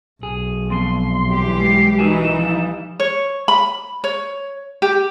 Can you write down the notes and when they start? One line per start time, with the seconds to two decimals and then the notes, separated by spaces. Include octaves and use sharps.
0.23 B1 G#4
0.70 F2 B2 C6
1.30 E3 G3 G4
1.60 G#3 C7
1.99 E3 D#4 F#4 A#4 G#5 E7
2.39 F3 G3 E4
3.00 C#5
3.48 B5
4.04 C#5
4.82 G4